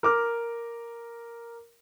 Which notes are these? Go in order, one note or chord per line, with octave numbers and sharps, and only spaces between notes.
A#4 D6 F6